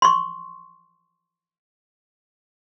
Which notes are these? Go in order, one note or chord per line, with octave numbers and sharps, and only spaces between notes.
C6 C#6